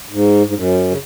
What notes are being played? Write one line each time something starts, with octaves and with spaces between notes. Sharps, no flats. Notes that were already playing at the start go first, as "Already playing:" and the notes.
G#2
G#2
F#2
C#3